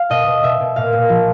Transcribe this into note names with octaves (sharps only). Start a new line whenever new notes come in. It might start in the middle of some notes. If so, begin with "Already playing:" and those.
Already playing: F5
B2 D#5
B2
B2 E5
B2
A#2 F5
A#2
F3